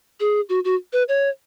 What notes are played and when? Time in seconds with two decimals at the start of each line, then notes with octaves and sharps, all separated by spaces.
0.20 G#4
0.49 F#4
0.65 F#4
0.93 B4
1.09 C#5